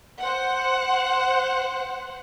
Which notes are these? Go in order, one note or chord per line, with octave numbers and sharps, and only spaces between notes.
C5 F#5